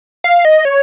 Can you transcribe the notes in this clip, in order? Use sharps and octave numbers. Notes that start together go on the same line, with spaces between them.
F5
D#5
C#5